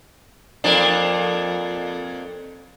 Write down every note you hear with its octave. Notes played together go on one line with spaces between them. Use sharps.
F2 A#3 D4